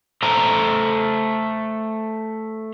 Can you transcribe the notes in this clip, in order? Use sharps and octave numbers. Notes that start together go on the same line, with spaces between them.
A3 A4 C5 A#5